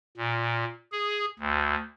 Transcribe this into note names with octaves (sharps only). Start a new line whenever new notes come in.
A#2
G#4
D2